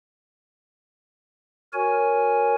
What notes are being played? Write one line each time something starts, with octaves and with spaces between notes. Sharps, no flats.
F#4 A#4 C#5 G#5